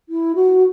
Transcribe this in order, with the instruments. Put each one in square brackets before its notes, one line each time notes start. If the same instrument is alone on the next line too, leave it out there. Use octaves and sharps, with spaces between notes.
[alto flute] E4
F#4